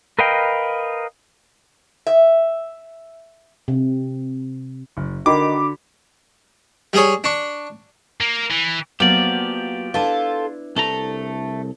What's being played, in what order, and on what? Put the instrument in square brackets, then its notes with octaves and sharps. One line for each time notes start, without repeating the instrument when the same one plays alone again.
[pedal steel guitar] A#4 B4 D#5 F5 G5
[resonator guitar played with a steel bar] E5
[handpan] C3
[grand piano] F#1
[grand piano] D3 [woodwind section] D#3 [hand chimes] F#4 B5 [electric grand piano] D6
[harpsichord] G3 G#4 C#5
D4 C#6
[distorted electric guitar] A#3
E3
[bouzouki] F3 [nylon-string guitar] F#3 A#3 B3 [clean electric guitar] G4 D5
[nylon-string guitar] D4 E4 B4 [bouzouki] F4 A4
[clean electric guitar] C2 A4 A#5 [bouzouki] A3